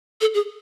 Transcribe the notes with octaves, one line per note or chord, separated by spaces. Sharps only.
A4
G#4